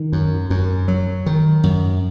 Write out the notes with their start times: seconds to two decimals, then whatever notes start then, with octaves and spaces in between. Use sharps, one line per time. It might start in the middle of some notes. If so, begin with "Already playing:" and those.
Already playing: D#3
0.12 F#2
0.50 F#2
0.88 F#3
1.26 D#3
1.64 F#2